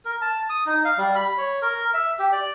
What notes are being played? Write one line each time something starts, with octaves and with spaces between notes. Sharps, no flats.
A#4
A5
D#6
D#4
F5
G3
B5
C#5
A#4
E5
G4
D5